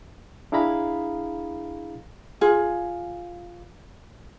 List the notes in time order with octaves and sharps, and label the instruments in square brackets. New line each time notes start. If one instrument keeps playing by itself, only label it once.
[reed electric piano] D4 E4 G#4 F5 A#5 B5
[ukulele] F4 G#4